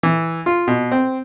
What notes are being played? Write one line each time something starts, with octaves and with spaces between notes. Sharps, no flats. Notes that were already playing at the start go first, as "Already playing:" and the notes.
E3
F4
B2
C4